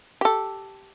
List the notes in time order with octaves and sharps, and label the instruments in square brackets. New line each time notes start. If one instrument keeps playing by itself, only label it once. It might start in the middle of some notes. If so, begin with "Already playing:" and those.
[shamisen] G4 A4